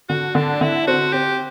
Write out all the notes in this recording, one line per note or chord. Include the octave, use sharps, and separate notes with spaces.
D3 F#4
D3 D4
D3 E4
C4 F#4
C4 G4